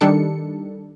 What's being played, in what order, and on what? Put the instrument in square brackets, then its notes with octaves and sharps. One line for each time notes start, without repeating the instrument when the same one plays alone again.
[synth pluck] D#3 G3 D4 A4 C#7